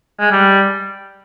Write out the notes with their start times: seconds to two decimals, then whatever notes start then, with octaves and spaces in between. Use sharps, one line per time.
0.20 G#3
0.32 G3